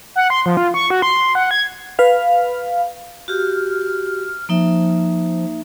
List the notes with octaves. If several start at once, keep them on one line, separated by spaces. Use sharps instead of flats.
F#5
C6
F3
F4
C#6
F#4
C6
F#5
G#6
B4 F5
F#4 G4 F6
F3 A#3 D#4 E5